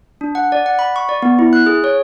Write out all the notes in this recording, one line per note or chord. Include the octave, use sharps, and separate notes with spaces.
D4
F#5
D5
F#5
B5
C#6
D5
B3
E4
F#6
G#4
C#5